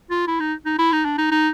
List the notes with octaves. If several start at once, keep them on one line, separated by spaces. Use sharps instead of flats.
F4
E4
D#4
D#4
E4
D#4
D4
D#4
D#4